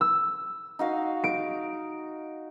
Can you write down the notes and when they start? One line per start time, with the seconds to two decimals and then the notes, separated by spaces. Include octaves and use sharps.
0.01 E6
0.79 D#4 F#4 F5
1.24 D7